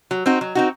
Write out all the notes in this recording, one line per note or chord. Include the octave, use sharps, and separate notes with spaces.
F#3
C4 D#4 F#4
F#3
C4 D#4 F#4